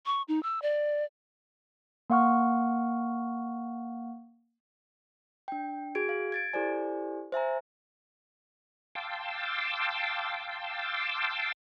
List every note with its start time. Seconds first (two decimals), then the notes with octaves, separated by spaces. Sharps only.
0.06 C#6
0.28 D#4
0.43 E6
0.62 D5
2.10 A#3 F5 F#5 C#6 F6
5.48 D4 G5
5.95 F#4 G#4 G#6 D7
6.09 F5
6.32 G#6 A6 D7
6.53 E4 G4 A4 C5 D5 G#5
7.32 C5 E5 G#5 A#5
8.95 F5 G5 A5 C6 D6 E6